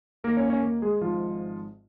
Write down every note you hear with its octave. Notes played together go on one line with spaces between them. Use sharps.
D#2 D#3 A#3 A#4
C#4 C#5
C#4 C#5
A#3 A#4
G#3 G#4
G#1 G#2 F3 G#3 F4